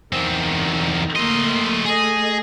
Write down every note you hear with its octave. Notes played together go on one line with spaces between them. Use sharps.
E2 D#3 C4
A3 A#3 D#5 C6
A3 G#4 D#5